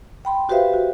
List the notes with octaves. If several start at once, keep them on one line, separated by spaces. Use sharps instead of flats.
G5 B5 C6
F#4 G4 B4 C5 E5 F5
F#4